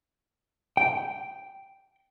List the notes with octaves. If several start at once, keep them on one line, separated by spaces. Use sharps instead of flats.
G5